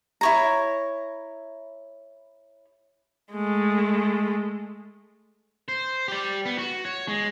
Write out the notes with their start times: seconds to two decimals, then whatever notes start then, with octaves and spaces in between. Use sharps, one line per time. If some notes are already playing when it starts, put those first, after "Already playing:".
0.21 E4 C#5 A#5
3.33 G#3 A3
5.68 C5
6.08 G4 D5
6.45 B3
6.58 F#4
6.85 C#5
7.08 G#3